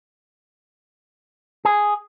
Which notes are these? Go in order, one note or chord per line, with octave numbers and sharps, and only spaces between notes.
G#4